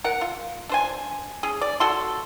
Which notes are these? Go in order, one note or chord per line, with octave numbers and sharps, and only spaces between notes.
A#4 F#5
F4
D4 C5 G#5
C#4 G#4
D5
F#3 F#4 A4 C6